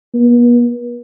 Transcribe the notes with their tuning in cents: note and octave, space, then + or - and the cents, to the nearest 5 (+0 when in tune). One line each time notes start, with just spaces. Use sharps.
B3 -45